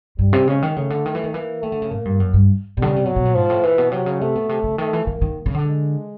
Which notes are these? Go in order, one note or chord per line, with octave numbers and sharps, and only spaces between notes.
G2 G3
C3
C#3 G#3
D#3
C#3 A3
D3
D#3
E3
D#3
E3 A#3
D#3 A3
D3
C#3
A2 A#3
G2
F#2
G2
B2 D3 G3
C#3
C3
B2 F#3
B2
A#2
G#2 F3
A2
A#2 E3
B2
C3 F#3
C#3
C3 A3
B2
C3
C#3
D#3 A3
E3
D#3 A#3
D#3
C#3
D3
G#3